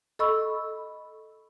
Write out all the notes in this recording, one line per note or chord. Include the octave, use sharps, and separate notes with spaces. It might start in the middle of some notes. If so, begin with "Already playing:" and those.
A4 D#5 B5 C#6 E6